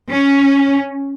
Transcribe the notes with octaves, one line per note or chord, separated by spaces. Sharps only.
C#4